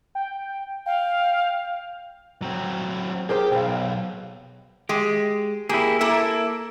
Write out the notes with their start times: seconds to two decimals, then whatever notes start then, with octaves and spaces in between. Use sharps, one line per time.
0.15 G5
0.86 F5 G5
2.42 F#3 C4
3.29 G4 G#4 A#4 C5 G5
3.52 B1 F5 G5
4.89 G#3 G4
5.69 A#3 E4 G4 G#4
6.01 A#3 E4 A4 E5